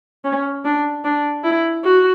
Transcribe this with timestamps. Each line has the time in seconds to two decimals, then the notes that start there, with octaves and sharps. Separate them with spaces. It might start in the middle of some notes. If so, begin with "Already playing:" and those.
0.24 C#4
0.65 D4
1.04 D4
1.44 E4
1.84 F#4